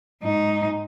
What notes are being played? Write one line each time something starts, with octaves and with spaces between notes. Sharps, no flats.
G#2 D#4